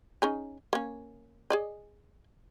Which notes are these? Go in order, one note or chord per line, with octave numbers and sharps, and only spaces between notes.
C#4 D#4 G#4
A#3 C#4
G#4 D5 D#5